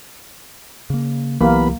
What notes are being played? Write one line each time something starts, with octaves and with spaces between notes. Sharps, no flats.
C#3 A#3
C2 E3 F#3 A#3 B3 E4 G4 B5